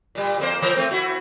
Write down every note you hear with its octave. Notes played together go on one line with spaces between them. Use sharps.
A#2 G3
F2 A#3 C5
E3 A#4
A3 C4
E4 F#4